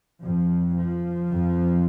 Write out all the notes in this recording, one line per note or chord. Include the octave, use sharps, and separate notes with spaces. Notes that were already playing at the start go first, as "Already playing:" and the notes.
F2 F3
F3
F2